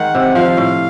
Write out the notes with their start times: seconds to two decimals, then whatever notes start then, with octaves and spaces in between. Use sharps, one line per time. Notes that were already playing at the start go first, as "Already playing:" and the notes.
Already playing: D#3 G#3 F#5
0.15 C3
0.35 F3 F5
0.57 A2